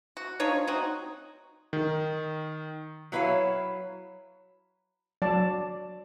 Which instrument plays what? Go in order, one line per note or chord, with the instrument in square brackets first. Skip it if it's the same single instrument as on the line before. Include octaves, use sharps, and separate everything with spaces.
[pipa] F#4
F3 D4 D#4 C#5
C4 D#4 F#4
[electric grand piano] D#3
[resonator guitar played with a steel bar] F#3 E4 B4 C#5 F5
[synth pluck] F#3 [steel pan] D5 A5